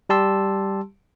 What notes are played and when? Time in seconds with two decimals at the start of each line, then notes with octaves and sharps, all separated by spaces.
0.09 G3 G4 A5 C6 E6